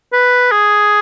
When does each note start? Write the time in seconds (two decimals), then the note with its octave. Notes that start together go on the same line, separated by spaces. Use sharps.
0.13 B4
0.51 G#4